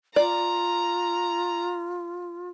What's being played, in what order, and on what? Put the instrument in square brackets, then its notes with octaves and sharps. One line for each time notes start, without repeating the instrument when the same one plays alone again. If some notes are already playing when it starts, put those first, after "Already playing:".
[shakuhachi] F4 [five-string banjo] D5 [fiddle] A#5